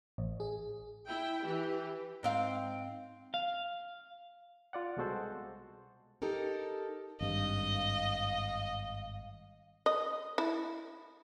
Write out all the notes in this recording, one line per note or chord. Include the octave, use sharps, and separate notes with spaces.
A1
G#4
E4 G5
E3 G4
G#2 C4 F5
F5
F4 D5 F#5
C2 B2 G#3 F#4 A4 C5
D#4 G4 A4 A#4
G#1 G2 D#5 F5
D#5
E4